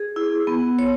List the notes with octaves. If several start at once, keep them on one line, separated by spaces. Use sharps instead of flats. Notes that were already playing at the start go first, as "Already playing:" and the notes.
Already playing: G#4
E4
B3
C#5